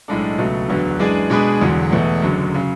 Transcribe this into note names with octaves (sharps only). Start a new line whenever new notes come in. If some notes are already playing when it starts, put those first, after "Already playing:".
B1 A2 G#3 D4 A4
C#2 B2 F#3 A3
E1 D2 D3 F#3 B3
F#2 E3 G#3 D4 G#4
B2 G#3 D4 G#4 B4
E1 E2 D3 F#3
E1 E2 B2 A3
F#1 F#2 D3 F#3
C#3 F#3